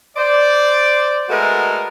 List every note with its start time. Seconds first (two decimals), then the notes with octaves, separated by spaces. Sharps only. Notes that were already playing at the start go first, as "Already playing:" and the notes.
0.17 C5 D5
1.30 G#3 A3 B3 F#4 A4 A#4